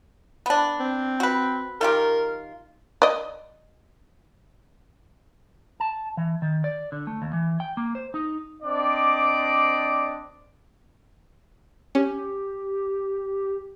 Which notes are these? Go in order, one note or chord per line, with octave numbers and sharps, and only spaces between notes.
B3 D4
C4
F#4 B4
D#3 F4 G4 A#4
D5 D#5
A5
E3
D#3
D5
D3
A3
D#2
E3
G5
A#3
C5
D#4
C4 D4 D5 D#5 D6
C#4 G4